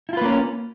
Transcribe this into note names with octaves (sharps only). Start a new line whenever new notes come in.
A#3 C#4 E4 F4 B4